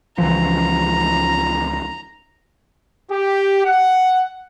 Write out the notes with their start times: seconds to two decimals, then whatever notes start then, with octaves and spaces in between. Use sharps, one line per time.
0.18 C#2 E3 F3 A#5
3.11 G4
3.65 F#5